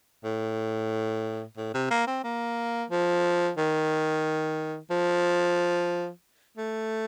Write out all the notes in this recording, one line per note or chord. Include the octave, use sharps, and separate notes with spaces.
A2
A2
C3
A#3
C4
A#3
F3
D#3
F3
A3